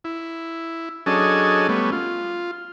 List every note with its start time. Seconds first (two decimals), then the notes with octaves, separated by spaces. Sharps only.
0.04 E4
1.06 F#3 C#4 D4 G#4 A4 D#5
1.69 G3 A3 B3 C#4
1.92 F4